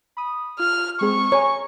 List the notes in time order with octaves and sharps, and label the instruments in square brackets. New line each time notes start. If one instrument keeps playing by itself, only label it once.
[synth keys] B5 D#6
[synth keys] F4 [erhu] F6
[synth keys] G#3 C4 G#4 [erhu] C#6
[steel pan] C#5 [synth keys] G#5 A#5